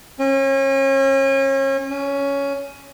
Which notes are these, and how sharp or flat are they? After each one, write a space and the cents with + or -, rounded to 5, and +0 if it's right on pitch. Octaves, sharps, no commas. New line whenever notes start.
C#4 -35
C#4 +10